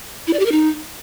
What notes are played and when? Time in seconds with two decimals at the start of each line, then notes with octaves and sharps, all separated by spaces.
0.27 E4
0.33 D5
0.39 G4
0.46 A#4
0.52 D#4